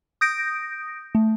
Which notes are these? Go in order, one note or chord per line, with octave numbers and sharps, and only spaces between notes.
D#6 G6 A#6 D7
A3